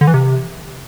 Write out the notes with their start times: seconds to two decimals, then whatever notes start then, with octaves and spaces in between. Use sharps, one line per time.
0.01 D3
0.07 E3
0.14 C3